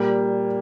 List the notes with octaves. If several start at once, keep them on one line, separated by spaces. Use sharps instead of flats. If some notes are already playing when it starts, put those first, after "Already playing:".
Already playing: A#2 G3 A#3